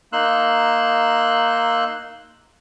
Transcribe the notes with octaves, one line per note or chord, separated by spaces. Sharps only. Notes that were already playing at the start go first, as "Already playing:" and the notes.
A#3 D#4 C6 E6 F#6